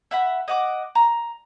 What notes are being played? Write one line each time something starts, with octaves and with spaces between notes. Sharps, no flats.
E5 F#5 B5
D#5 F#5 D6
A#5